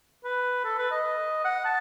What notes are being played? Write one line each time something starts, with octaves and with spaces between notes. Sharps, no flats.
B4
A4
B4
D#5
F#5
A5